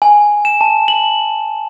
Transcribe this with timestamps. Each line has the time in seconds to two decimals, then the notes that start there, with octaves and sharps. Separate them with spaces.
0.02 G#5
0.45 E7
0.61 A5
0.88 F#7